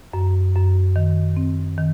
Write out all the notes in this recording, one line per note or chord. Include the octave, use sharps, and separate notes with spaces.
F#2
F#2
D#3
C4
D#3